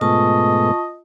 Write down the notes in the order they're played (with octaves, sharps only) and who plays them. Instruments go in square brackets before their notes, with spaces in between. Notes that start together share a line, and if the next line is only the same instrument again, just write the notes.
[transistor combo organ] G#2 B2 A3 [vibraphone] F4 A5 C#6 [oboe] D#5